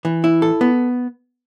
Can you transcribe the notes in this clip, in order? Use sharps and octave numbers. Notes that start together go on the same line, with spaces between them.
E3
E4
A4
B3